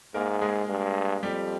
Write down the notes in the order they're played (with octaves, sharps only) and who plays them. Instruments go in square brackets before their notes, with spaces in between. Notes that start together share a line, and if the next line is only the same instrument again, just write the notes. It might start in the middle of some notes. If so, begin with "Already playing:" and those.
[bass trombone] G#2 [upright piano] A#3 A#4
[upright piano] G#3 G#4
[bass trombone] G2
[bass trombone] F2 [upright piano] G3 G4